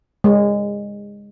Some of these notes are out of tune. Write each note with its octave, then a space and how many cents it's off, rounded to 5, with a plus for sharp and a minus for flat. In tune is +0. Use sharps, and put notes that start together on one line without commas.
G#3 -25 C#5 +0